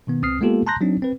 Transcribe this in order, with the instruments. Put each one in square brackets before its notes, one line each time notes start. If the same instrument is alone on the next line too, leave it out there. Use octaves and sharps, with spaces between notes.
[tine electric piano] B2 D#3 B3
C#2 C4 D#6 F6 C7
G#3 A#3 B3 F4 G4 A4
A5 A#5 C6 F#6 G6 A#6
F#3 C4 D4 D#4
C4 B4